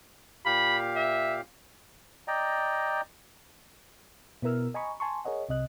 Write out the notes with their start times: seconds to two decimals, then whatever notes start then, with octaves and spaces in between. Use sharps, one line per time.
0.46 A#2 G4 F5 B5
0.96 E5
2.28 D5 D#5 G5 A#5
4.42 B2 B3 E4 A#4 E6 F6
4.74 D#5 G#5 A#5 B5 C#6
5.00 G#5 A5 C6 C#6
5.25 G#4 A#4 C#5 D#5 F#5
5.49 C2 C3 D#5 F#6